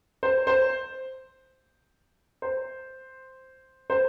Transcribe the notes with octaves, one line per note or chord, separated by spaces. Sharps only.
C5
C5
C5
C5